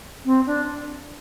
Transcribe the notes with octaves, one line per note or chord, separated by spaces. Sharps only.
C4
D4